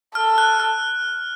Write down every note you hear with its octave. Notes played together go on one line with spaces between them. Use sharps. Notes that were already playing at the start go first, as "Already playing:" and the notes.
A4 F6
F#6
F6